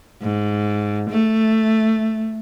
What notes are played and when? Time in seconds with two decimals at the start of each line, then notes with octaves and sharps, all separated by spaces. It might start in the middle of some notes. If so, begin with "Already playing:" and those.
0.22 G#2
1.10 A3